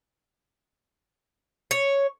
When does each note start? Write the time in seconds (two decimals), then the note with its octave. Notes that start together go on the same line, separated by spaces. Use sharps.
1.71 C#5